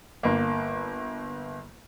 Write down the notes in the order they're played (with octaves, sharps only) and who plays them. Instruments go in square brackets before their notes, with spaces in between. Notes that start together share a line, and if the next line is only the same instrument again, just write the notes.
[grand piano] G1 A#3